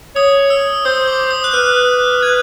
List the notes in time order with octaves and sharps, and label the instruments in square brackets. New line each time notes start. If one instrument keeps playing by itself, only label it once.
[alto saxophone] C#5 [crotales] D#6
[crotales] E6
[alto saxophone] C5 [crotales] D#6
[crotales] D6
D#6
F#6
[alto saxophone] B4 [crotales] F6
[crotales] G#6